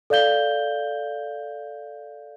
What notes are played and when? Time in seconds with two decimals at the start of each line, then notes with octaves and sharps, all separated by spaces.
0.10 A4 D5 F5 G6 G7